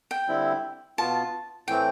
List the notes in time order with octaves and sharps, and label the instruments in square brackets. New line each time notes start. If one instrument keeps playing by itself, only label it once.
[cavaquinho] G5
[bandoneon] D3 G3 C4 E4
[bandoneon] B2 B3 F4 [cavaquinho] A5
[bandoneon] A2 E3 A3 C4 [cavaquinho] G5